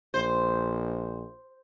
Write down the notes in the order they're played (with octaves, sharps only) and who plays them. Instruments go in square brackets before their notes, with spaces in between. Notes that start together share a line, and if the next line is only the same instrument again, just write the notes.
[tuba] A#1 [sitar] C5